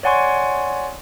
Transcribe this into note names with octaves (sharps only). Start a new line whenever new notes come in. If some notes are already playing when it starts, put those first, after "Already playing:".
C#5 D5 F#5 G#5 C6 C#6